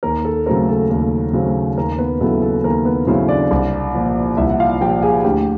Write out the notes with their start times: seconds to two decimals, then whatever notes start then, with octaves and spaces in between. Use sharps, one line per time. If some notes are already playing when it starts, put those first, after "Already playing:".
0.03 D#2 A#4
0.25 A4
0.46 C#3 F#3 A3 C4 A#4
0.69 A4
0.90 D#2 A4
1.33 C#3 F#3 A3 C4
1.78 D#2 A#4
1.98 B3 B4
2.21 C#3 F#3 B3 E4 A4
2.42 A4
2.64 D#2 A#4
2.85 B3 B4
3.07 C#3 F#3 B3 C4 E4 C5
3.29 D4 D5
3.51 C2
3.94 A#2 F3
4.37 C2 E4 E5
4.50 F#5
4.60 F4 F5
4.81 A#2 F3 G4 G5
5.02 G#4 G#5
5.24 D2 G4 G5